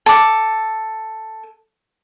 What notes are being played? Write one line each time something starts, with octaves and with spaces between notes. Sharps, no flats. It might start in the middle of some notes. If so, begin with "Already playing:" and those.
A4 D6